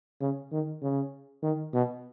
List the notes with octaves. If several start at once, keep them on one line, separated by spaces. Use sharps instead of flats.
C#3
D#3
C#3
D#3
B2